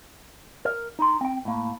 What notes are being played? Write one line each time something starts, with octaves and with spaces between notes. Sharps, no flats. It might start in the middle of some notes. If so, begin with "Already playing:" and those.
A#4
D#4 C6
C4 G5
A2 A#3